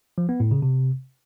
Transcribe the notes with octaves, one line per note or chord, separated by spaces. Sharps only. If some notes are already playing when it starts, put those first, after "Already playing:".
F3
B3
A2
C#3
C3